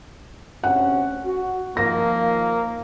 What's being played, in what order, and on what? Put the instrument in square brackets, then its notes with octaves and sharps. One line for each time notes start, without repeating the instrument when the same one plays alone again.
[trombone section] D2 C3 C#4 [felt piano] F#5
[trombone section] F#4
[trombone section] D#3 F3 [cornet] A#3 [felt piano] A#6